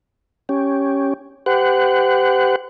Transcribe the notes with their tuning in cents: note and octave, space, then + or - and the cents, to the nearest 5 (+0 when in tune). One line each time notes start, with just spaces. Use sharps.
C#4 +0 G4 +0
G4 +0 C5 -45 F#5 +0